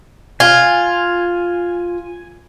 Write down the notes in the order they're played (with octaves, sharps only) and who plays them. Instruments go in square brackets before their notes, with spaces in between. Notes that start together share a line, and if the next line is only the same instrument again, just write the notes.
[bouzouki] F4 [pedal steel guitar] G#5